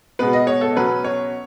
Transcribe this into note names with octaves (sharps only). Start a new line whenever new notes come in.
B2 G#3 B3 B4
D#5
C#5
A4
B2 F#3 C#4 B4
C#5